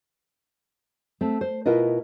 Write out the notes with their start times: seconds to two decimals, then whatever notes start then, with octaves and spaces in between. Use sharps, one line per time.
1.21 A3 C4
1.41 C5
1.66 B2 E4 F4 A#4 B4 D#5